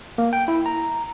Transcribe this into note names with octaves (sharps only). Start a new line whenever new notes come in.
A#3
G5
E4
A#5